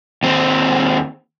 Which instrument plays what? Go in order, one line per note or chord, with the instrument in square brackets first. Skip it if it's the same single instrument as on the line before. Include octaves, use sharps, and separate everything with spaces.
[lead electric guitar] D#2 C4